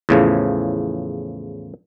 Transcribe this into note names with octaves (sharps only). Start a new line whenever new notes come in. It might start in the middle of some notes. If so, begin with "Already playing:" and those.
E2 A2 C#3 F3